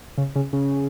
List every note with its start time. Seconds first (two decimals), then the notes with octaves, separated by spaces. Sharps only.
0.18 C#3
0.35 C#3
0.53 C#3